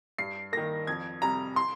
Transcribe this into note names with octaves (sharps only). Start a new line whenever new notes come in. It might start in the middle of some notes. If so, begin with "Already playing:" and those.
G2 C7
D#3 A#3 A#6
F2 G#6
C3 G3 A#5
C6